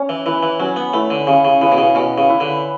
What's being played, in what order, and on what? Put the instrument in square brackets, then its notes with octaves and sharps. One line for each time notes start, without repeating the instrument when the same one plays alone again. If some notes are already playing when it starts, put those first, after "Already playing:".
Already playing: [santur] C#4
[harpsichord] E3
[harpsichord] E3 [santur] E4 B4
[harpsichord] E3
[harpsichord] F#3 [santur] C#4
[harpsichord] B3
[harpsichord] A3 [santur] E4 B4
[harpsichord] D3
[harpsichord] C#3 [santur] C#4
[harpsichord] C#3
[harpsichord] C#3 [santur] E4 B4
[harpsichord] B2
C#3
[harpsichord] B2 [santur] C#4
[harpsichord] C#3
[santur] E4 B4
[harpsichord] D3